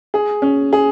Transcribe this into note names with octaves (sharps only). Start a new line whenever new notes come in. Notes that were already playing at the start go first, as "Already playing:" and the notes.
G#4
C#4
G#4